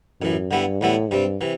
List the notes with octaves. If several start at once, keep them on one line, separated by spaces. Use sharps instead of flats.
A1 F#2 A2 E3
G2 D3 G3 B3 E4
E2 A2 D3 G3 B3 E4
G2 C3 G3 C4
C3 E3